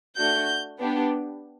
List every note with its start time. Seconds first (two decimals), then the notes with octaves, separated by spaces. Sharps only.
0.17 A3 D4 F#4 G6
0.79 B3 D4 G4